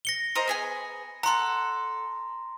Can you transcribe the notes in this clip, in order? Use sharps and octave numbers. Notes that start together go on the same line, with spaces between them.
A#6 C#7 G7
A#4 C5 D#5
B3 G#4 G#5
A4 F#5 A#5 C6